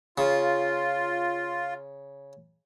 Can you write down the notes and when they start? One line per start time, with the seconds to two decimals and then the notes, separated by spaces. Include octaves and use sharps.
0.18 C#3 F4